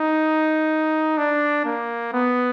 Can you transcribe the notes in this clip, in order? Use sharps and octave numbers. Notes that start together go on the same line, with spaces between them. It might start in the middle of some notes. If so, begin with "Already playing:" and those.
Already playing: D#4
D4
A#3
B3